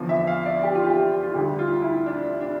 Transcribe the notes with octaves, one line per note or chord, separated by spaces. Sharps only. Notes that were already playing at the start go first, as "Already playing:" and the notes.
Already playing: E2 D3 F3
E5
F5
D5
G4
F4
G4
F4
D2 D3 G3 G4
F4
E4
D4
D4